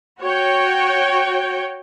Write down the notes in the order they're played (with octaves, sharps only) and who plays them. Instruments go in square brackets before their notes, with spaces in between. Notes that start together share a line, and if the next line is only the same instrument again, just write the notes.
[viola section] F#4 C#5 G5